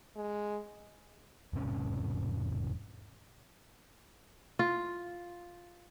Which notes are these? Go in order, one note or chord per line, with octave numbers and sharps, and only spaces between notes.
G#3
E1 G#2 C3 C#4
F4